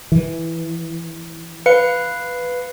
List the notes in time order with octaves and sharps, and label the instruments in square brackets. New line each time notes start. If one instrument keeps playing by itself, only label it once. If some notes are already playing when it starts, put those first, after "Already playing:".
[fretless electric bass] E3
[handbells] B4 F5 C#7